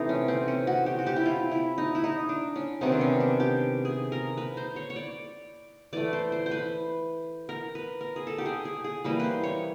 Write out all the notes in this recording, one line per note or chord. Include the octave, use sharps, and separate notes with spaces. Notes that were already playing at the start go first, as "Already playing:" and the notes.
Already playing: C3 E3 A3 D#4
C#4
C4
C#4
F#4
G4
F#4
G4
E4
F4
E4
D#4
E4
D#4
D4
C#4
C3 D#3 F#3 B3 C4
D4
C#4
D4
G4
G#4
A#4
B4
C5
C#5
C#5
D5
E3 A3 D5
C5
C5
C5
B4
A#4
B4
A#4
G#4
A4
G4
G#4
G#4
G#4
E3 G3 A#3 B4
B4 C5
C#5